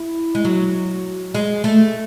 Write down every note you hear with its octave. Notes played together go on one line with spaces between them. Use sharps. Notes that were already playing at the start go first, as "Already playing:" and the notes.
Already playing: E4
G#3
F#3
G#3
A3